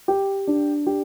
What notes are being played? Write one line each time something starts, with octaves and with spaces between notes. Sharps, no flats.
G4
D4
G4